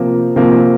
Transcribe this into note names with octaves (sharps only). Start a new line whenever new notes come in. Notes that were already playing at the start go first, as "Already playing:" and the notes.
Already playing: C3 F3 A#3
C3 F3 A#3